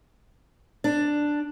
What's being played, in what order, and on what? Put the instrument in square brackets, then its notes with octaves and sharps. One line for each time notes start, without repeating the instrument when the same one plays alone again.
[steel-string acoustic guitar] D4